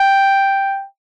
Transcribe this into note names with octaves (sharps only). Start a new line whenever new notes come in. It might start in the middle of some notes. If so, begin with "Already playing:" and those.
Already playing: G5